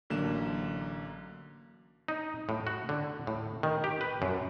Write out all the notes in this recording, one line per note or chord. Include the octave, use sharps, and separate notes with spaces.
A1 D3 F#3 A#3 E7
D#4
A2
F#4
D3
A2
D#3
G4
B4
F#2